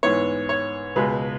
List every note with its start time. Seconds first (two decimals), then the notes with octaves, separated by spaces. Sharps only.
0.03 G#2 E3 B3 C#5
0.49 C#5
0.96 C#2 B2 G#3 B4